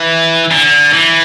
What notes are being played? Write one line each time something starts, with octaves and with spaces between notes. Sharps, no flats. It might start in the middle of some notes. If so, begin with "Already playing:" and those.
Already playing: E3
D3
E3